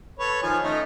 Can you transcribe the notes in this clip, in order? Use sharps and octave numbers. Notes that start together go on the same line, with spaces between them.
A4 B4 C#5
D#3 F3 G#5
A3 C#4 D#4